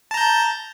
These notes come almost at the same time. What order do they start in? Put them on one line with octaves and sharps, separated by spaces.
A5 A#5 G6